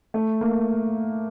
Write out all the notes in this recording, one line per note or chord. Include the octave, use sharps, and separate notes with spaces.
A3
A#3